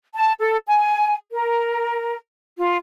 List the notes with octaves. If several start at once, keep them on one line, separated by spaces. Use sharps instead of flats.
A5
A4
G#5
A#4
F4